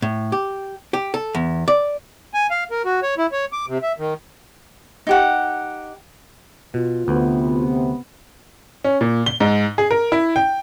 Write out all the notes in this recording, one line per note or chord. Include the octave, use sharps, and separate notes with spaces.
A2
G4
G4
A4
E2
D5
G#5
F5
A#4
F#4
C#5
E4
C#5
D6
C3
E5
D#3
D#4 G4 F#5
B2 F4
D2 C3 B3
C#4
A#2
G7
G#2
G#4
A#4
E4
G5